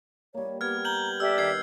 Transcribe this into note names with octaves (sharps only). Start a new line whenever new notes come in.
G3 A#3 C#5
B3 G4 F6 G#6
A#5 G6 F#7 G7
G4 A4 D5 E5 E6
D#3 G#6 C7